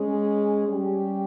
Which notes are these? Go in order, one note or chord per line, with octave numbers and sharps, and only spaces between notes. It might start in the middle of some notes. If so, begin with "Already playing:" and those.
Already playing: G#3 C#4 G#4
G3 C#4 G4